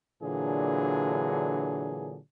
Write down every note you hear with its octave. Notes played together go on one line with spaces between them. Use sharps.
A#2 D3 E3 F#3 D4 G#4